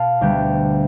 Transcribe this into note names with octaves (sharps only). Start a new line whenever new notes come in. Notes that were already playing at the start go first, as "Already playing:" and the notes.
Already playing: B2 F5 A5 B5
D2 D3 G3 B3 G5